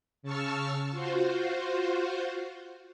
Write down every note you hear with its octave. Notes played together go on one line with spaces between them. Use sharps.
C#3 A5 C#6 E6 F6
F4 F#4 C5